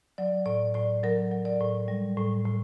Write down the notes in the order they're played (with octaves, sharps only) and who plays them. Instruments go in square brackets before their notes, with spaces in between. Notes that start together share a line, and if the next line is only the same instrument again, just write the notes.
[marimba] F#3 D5
A2 D5
A2 D5
F#3 A#4
F#3
D5
A2
G3
A2
A2